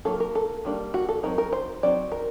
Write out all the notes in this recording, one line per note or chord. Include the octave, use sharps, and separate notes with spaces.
D#3 F#3 A#3 A4
A#4
A4
D#3 G3 A#3 D4
F#4
A4
F#3 C4 D#4 A#4
A#4
C5
F#3 C4 D#4 D5
A#4